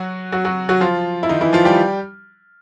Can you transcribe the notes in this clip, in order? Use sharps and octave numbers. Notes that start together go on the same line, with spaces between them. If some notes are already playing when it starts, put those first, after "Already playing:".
Already playing: F#3 F#4
F#3 F#4
F#3 F#4
F#3 F#4
F3 F4
E4
D#3 D#4
E3 E4
F3 F4
G3 G4